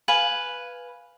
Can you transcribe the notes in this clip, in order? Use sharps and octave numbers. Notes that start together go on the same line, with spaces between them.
B4 F5 G#5